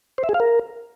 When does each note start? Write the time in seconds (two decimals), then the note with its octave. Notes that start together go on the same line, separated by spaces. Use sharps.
0.18 C5
0.24 E5
0.29 G#4
0.34 F5
0.40 A#4